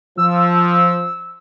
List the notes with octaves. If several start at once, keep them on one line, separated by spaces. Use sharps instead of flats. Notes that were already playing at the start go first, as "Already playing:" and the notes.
F3 E6